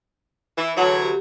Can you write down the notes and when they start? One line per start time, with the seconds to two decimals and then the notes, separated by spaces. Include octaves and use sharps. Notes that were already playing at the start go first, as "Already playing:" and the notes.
0.57 E3
0.77 D2 E3 F#3 C#5 F#5 A5
0.89 G#4
1.02 G4